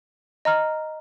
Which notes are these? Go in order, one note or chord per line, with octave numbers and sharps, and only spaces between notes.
D#5 A#5 F6